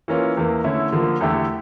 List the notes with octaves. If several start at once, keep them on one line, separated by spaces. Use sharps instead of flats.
E3 A#3 C#4 F4
E2 E3 A#3
D3 A3 C#4 E4
D3 F3 A#3
E2 D3 A3 E4 G4